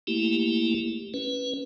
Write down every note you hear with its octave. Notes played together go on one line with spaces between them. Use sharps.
A3 A#3 E4 G4
C#4 B4